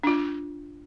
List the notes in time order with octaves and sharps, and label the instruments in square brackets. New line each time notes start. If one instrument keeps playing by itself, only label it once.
[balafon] D4 F4